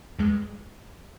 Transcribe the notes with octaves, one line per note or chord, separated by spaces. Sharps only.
E2 G2 G#3